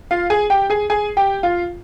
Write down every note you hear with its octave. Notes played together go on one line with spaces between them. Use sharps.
F4 F5
G#4 G#5
G4 G5
G#4 G#5
G#4 G#5
G4 G5
F4 F5